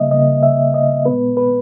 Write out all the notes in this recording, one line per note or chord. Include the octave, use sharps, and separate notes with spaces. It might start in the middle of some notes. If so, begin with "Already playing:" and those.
Already playing: C#3 G3 A#3 D#5 E5
C#3 G3 A#3 D#5
E5
D#5
A#2 G#3 B3 B4
B4